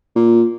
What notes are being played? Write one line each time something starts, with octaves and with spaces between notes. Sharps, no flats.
A#2